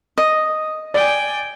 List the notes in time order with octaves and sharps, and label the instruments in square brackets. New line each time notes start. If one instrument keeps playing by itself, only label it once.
[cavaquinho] D#5
[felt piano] D5 [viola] G5 G#5